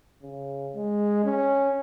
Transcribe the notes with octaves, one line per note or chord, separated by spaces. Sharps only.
C#3
G#3
C#4